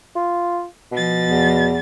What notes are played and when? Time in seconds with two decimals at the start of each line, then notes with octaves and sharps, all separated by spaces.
0.16 F4
0.91 B2 F3 A6
1.27 E2